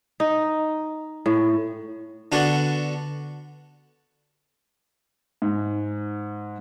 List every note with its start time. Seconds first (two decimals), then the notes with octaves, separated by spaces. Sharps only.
0.20 D#4
1.26 A2
2.32 D3 B3 D4 F#4
5.42 G#2